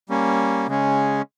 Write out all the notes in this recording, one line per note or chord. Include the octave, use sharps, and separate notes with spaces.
G3 A#3 C#4
C#3 G#3 C#4